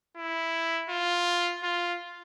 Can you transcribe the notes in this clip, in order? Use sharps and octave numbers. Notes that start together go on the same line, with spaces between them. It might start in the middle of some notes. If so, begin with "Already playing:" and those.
E4
F4
F4